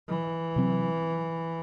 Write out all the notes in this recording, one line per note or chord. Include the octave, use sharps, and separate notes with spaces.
E3
C3 F#3 C4